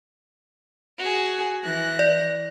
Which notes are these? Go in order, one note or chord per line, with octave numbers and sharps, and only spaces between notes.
F#4 G#4
E3 F#6 A#6
D5